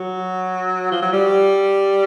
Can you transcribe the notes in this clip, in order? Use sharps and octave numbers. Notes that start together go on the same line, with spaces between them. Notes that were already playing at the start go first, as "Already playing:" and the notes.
Already playing: F#3
F3
F#3
G3